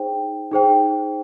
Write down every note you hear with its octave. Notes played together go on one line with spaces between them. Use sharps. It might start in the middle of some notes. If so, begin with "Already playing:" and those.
Already playing: D#4 G#4 C5 G5
D#4 G#4 C5 G5